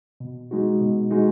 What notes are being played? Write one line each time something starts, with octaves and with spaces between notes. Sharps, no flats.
B2
G#3 D#4 F#4
B2
G#3 D#4 F#4